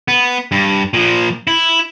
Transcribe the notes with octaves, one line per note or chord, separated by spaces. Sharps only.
B3
G2
A#2 F3
E4